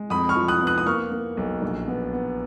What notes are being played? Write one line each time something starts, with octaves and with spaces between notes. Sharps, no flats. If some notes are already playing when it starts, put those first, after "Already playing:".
Already playing: G#3
F2 B5 D#6
C#6 F6
F3
D#6 F#6
B3
D#6 F#6
D#6
A#3 C#6 F6
A#3
B1
A#1
B3
B3